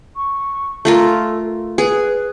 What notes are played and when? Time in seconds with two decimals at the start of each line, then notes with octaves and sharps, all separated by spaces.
0.16 C#6
0.85 A3 F4 A4 A#4
1.78 G#4 B4